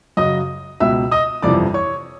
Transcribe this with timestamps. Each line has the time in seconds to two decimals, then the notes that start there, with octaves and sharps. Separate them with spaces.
0.17 F#2 C#3 F#3 D#5 D#6
0.80 C#2 B2 F#3 E5 E6
1.12 D#5 D#6
1.43 G1 F2 C3 E3 D5 D6
1.74 C#5 C#6